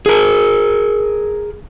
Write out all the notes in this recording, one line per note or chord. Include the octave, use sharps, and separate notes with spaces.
G#4 A#4